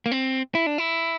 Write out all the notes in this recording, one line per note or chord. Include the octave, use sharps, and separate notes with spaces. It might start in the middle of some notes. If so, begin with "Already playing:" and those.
A#3
C4
E4
D4
E4